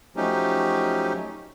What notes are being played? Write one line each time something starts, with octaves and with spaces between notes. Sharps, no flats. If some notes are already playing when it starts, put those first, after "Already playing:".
F3 F#3 A3 C#4 D#4 G4